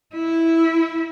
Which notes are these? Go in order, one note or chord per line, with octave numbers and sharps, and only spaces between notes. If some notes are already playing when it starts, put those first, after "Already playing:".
E4